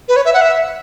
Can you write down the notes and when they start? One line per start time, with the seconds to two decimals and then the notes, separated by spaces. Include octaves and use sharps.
0.08 B4
0.16 C#5
0.25 E5
0.34 F#5
0.41 E5